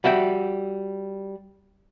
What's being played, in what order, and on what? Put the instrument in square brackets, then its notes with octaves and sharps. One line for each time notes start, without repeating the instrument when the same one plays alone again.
[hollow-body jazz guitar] G3 F#4 E5 G5